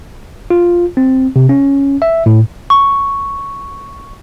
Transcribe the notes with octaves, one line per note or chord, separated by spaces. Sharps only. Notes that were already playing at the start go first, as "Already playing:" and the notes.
F4
C4
C3
C#4
E5
A2
C#6